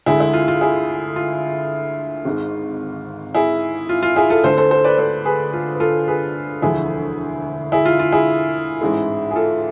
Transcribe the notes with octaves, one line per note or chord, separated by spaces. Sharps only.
D2 D3 G#3 E4 G#4
E4
F4
F4
E4 G#4
F4
G#1 G#2 G#3
E4 G#4
F4
F4
E4 G#4
F4 A4
D2 D3 A3 A4 C5
A4 C5
A4 C5
B4 D5
A4 C5
G#4 B4
F4
B4
F4 A4
G#4 B4
E1 D2 D3 F3 E4 G#4
E4 G#4
F4
F4
E4 G#4
A1 G#2 G#3
G#4
F4 A4